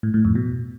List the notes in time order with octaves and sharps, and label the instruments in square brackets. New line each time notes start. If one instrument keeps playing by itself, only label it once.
[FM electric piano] A2
A2
F2
B2